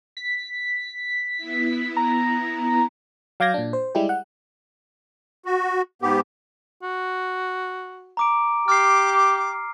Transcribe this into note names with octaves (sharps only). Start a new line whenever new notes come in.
B6
B3 E4
A#5
F#3 F5 D6 G6 G#6 A#6
A#2 D4
C5
G3 G#3 E4 G4
F#5
F#4
G#2 B3 G4
F#4
A#5 D6 D7
G4 D6 F6 C7